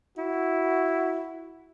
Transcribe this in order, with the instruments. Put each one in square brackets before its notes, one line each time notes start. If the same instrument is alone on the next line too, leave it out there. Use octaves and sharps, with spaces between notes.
[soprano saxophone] E4 [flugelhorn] F#4